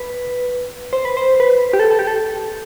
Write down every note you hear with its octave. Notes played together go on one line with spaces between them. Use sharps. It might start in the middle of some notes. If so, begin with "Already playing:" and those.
Already playing: B4
C5
B4
C5
B4
G4
A4
A4
G4
A4